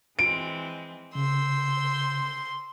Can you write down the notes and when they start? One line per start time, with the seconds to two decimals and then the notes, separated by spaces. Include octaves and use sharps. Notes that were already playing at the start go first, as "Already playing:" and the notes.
0.19 E3 G#3 C4 D7
1.15 C#3 C6 E6 G6